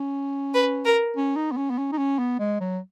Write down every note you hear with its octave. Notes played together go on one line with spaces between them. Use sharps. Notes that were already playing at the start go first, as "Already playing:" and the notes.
Already playing: C#4
B4
A#4
C#4
D#4
B3
C#4
B3
C#4
D#4
C#4
B3
G#3
F#3